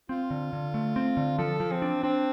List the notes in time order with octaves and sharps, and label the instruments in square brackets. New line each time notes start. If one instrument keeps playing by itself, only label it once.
[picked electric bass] C4 [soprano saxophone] F4
[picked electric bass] D3
D3
A3
C4
D3
[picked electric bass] F3 [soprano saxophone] A4
[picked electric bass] F3
[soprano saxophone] C4
[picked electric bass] D4
[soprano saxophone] C4 [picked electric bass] D4